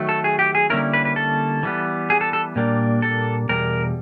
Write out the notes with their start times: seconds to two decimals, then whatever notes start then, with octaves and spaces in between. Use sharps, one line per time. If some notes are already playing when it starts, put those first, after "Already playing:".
Already playing: D#3 F#3 A3
0.09 A4
0.24 G#4
0.39 G4
0.55 G#4
0.70 D3 G3 A#3 C#4 E4 A#4
0.93 B4
1.05 B4
1.16 A4
1.63 E3 G3 B3
2.10 G#4
2.21 A4
2.33 A4
2.56 A#2 G3 A#3 D4
3.02 A4
3.49 E2 B2 G3 A#4